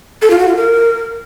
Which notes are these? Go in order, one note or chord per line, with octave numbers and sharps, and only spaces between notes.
A4
F4
F#4
F4
A#4